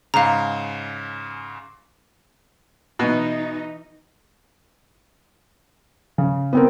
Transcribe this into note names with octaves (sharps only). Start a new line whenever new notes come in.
G#2 C#3 F5 A#5
B2 E3 D#4
C#3
B3 C4 A#4